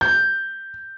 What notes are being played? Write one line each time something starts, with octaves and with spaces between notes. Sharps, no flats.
G6